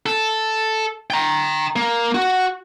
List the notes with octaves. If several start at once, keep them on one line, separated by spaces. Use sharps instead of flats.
A4
G5 A#5
A#3
F#4